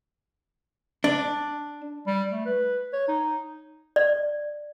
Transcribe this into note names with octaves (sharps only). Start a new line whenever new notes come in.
D4
G3
A3
B4
C#5
D#4
D5